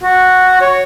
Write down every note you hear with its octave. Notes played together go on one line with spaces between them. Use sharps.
F#4
C#5